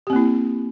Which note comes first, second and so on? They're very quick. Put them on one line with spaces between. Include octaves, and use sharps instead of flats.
G4 C4 A#3 E4